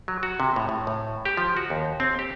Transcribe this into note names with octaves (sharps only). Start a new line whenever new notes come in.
F#3
F#4
C3
A2
A2
A2
G4
F3
F#4
D#2
C4
G4